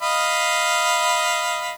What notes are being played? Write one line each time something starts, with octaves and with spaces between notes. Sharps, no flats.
D#5 F5 B5